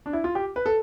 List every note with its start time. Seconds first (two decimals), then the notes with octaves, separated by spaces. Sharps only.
0.06 D4
0.13 E4
0.24 F4
0.35 G4
0.56 B4
0.66 A4